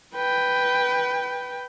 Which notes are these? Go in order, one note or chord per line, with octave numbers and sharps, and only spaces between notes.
B4 G5